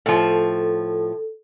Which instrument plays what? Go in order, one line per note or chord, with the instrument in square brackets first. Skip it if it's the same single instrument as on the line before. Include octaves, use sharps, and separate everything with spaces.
[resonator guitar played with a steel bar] A2 F3 [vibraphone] A4